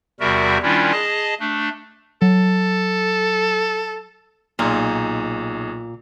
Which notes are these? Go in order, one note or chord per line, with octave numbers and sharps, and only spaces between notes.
E2 C3 G3 F#4 A#4 E5
D#3 G3 C#4 D4 E4 F4
G#4 D#5 A5
A3 D4
F#3 A4
B1 A#2 D#4 G#4